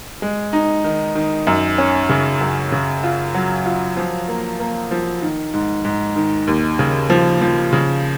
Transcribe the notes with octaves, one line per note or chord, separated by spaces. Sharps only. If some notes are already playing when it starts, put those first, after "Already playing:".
G#3
D#4
D#3
D#3
F#2
C#4
C#3
F#2
C#3
F4
F#3
F4
F3
A#3
A#3
F3
D#3
G#2
G#2
D#3
D#2
C#3
F3
F3
C#3